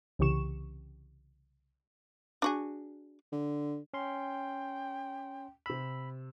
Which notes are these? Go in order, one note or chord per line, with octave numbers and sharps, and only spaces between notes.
C2 C#3 E3 G4 C#6 E7
D4 F#4 G#4
D3
C#4 G5 C6
C3 B5 E6